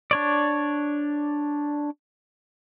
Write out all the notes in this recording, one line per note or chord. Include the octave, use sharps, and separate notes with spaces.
D4 C#5 D5